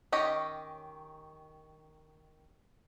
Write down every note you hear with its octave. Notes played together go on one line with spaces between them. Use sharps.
D#3 C#4 G4 C#5 D#5